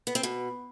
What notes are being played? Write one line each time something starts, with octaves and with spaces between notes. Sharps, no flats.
B3
C4
B2